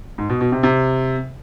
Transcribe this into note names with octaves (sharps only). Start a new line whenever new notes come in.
G#2
B2
B2
C3
C3